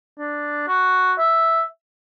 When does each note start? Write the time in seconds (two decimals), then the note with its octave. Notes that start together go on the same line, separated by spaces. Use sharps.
0.19 D4
0.68 F#4
1.19 E5